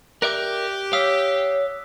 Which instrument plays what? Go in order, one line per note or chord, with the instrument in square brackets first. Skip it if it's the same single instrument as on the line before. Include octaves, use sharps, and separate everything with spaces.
[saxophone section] G4 [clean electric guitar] A#4 D5 E5 [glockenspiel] D6 F#6
[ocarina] C#5 [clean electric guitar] F5 [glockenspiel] D#6 E6 B6